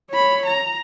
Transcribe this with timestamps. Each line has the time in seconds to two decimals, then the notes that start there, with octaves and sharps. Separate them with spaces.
0.10 C#5 B5
0.46 A#5